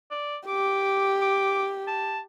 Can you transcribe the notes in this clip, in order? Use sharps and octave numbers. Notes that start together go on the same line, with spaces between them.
D5
G4 D6
D6
A5